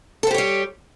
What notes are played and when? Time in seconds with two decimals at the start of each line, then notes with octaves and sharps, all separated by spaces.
0.23 A4
0.27 C5
0.31 G4
0.34 C#5
0.38 G3